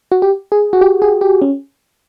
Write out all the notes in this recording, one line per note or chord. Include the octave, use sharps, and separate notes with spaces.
F#4
G4
G#4
F#4
G4
G#4
G4
C#4